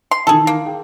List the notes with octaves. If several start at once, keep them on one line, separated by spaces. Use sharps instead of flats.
C6
D#3 E3 G#4 A4
A#3
G#4 G5